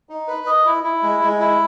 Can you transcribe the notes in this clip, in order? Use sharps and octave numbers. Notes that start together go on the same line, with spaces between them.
D#4
B4
D#5
E4
E4
G#3
G#3
E4